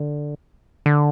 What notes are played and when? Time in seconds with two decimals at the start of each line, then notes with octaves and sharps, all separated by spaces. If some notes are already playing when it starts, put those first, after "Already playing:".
Already playing: D3
0.86 D3